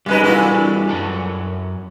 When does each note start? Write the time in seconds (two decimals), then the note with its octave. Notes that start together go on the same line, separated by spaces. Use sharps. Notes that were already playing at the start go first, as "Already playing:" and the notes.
0.06 F#2 G3 G#3 D#4 B4
0.24 A#2 E3 G3 D4 F#4 A4
0.89 F#2 F#5 A5